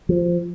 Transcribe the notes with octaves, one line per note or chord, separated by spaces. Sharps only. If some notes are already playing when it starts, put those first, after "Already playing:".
F3